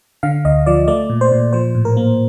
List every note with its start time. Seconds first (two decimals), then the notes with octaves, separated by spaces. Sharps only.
0.23 D3 F5
0.45 D2 D#5
0.66 F3 D5
0.88 A3 D5
1.09 A#2
1.21 C5
1.32 A#2
1.53 F3 C5
1.75 A2
1.85 A#4
1.97 A#3